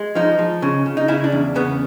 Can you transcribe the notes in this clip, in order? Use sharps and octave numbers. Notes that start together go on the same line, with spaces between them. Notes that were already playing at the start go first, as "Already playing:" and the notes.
Already playing: G#3
F3 D#4
F3
C#3
C#3
D#4
C#3 E4
D4
E2
C#3 B3